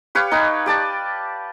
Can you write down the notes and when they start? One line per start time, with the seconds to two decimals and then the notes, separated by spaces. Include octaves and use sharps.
0.15 G4 B4 C#5 F5
0.31 D#4 G4 B4
0.66 G4 D5 A5